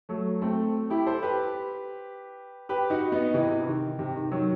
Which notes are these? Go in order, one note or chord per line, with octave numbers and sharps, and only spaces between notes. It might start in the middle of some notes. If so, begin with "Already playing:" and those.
F#3 A3
A3 C4
E4 G4
A4 C5
G4 B4
G4 B4
D#4 F#4
B3 D#4
C3 E3
D#3
C3
D#3
D#3 F#3